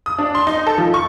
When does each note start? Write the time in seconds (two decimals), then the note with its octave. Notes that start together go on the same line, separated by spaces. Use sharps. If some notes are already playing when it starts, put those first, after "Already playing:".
0.06 D#6
0.18 D4
0.35 C6
0.47 D#4
0.67 A4
0.78 F3
0.94 C#6